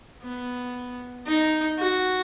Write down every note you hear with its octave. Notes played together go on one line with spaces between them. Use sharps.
B3
D#4
F#4